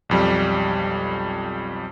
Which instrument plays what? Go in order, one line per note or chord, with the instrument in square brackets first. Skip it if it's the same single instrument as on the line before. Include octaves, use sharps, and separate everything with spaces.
[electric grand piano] B1 F2 G3